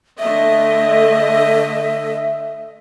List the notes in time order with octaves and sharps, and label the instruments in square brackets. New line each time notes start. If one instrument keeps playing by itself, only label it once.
[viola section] D3 A3 D#5 [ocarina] E5